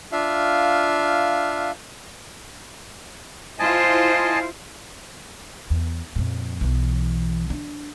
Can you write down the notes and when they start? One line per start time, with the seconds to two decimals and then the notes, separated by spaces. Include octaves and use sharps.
0.12 D4 F4 E5 F5
3.59 E4 F4 C5 D#5 G#5 A5
5.70 E2
6.16 F2 A#2
6.61 B1 E3
7.50 D4